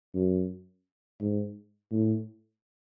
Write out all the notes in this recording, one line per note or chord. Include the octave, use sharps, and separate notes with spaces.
F#2
G#2
A2